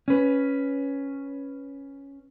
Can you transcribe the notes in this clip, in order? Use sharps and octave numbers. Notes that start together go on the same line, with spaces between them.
C#4 B4